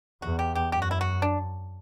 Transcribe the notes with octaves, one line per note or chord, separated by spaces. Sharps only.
E2 F#4
G4
G4
F#2 G4
F#4
E4
F#4
D4